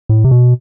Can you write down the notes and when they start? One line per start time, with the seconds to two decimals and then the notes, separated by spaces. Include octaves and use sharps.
0.09 A2
0.24 C3
0.31 B2